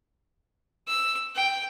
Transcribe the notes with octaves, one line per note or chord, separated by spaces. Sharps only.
E6
G5